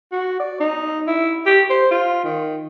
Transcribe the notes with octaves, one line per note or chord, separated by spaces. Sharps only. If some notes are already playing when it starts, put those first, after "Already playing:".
F#4
D5
D#4
E4
G4
C5
F4
D#3